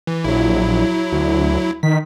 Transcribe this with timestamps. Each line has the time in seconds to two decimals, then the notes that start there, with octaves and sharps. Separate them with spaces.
0.07 E3
0.24 A#1 F#3 E4
1.12 D2
1.83 D#3 B6